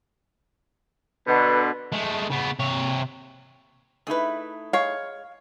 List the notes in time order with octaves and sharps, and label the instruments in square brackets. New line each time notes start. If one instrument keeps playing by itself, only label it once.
[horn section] B2 D3 [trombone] B4
[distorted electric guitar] G#3 A3
C#3 B3
C3 C#5
[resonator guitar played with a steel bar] A3 D#4 E4 [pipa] G#4 B4
[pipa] G#3 C#5 [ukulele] F5